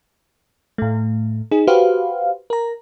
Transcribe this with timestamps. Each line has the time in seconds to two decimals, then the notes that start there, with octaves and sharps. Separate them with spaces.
0.78 A2 A3
1.52 D#4 G#4
1.67 F#4 G4 B4 C5 F5
2.50 A#4 A#5